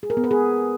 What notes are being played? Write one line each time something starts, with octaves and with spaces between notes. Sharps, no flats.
G#4
A#4
B3
B4
G#4